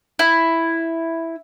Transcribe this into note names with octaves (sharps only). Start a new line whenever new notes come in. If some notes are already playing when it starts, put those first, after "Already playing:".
E4